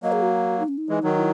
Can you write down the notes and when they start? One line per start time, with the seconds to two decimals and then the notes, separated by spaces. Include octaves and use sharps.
0.03 F#3 A#3 D#5
0.12 G#4
0.22 F#4
0.60 D#4
0.68 C#4
0.78 D#4
0.89 E3 G#3
1.03 D#3 F#3
1.17 E4